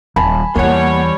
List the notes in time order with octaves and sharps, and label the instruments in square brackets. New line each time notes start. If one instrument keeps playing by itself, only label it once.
[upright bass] D#1 [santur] G#5 A5 B5
[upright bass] E2 E3 [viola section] G3 C#5 [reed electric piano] A#3 F#5